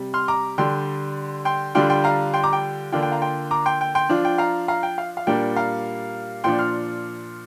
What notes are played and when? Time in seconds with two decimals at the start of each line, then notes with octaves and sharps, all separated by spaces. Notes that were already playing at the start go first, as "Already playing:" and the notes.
Already playing: C3 G3
0.14 C6 F6
0.28 A#5 D6
0.58 D3 G3 D4 G5 C6
1.45 G5 C6
1.75 D3 G3 D4 F4 G5 C6
1.90 G5 C6
2.04 F5 A#5
2.34 G5 C6
2.43 A#5 D6
2.53 G5
2.92 D3 A#3 D4 F4 G5
3.03 G5
3.12 F5 A#5
3.22 G5 C6
3.51 A#5 D6
3.65 G5 C6
3.81 G5
3.95 G5 C6
4.09 F3 D4 F4
4.25 G5
4.38 F5 A#5
4.68 F5 A#5
4.83 G5
4.98 F5
5.17 F5
5.27 A#2 G3 A#3 D4 G5
5.56 F5 A#5
6.44 A#2 F3 D4 G5 C6
6.59 C6 F6